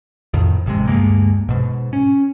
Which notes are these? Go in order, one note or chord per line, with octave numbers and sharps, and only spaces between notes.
F2 A2 D#3
A1 C3 G#3
D2 G2 G#3 A#3
G#2 B2
C#4